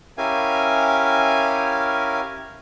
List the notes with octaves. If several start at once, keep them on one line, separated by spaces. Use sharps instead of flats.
C#4 E4 G4 A#4 F5 G#5